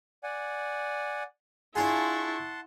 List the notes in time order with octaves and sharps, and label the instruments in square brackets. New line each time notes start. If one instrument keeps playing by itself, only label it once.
[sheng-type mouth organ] D5 F#5 G#5
[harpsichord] D4 F4 G#4 [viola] E4 C#6 [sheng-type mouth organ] F#5 A5 C6